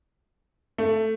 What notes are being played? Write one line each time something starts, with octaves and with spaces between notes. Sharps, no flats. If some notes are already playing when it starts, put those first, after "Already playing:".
A3